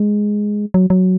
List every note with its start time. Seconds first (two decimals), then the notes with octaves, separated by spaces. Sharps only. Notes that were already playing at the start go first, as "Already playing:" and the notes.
Already playing: G#3
0.74 F#3
0.90 F#3